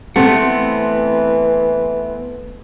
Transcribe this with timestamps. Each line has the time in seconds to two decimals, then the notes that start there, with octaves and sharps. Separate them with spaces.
0.16 E3 A3 B3 C4 F#5